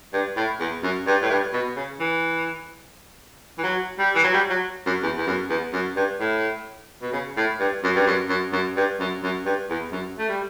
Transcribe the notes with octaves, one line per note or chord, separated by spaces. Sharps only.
G2
A2
E2
F#2
G2
A2
G2
B2
C#3
E3
E3
F#3
G3
E3
F#3
G3
F#3
F#2
E2
E2
F#2
E2
F#2
G2
A2
B2
C#3
A2
G2
F#2
G2
F#2
F#2
F#2
G2
F#2
F#2
G2
E2
F#2
A3
G3